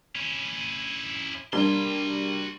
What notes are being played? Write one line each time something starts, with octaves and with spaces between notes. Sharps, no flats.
C#4 E4
G3 A#3 D4 F#4 C6